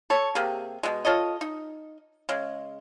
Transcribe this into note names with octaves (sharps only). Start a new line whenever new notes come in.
A4 C#5
C3 A#3 G4 G#4
B2 G#3
F4 A4 C#5 D#5
D#4
C#3 G#3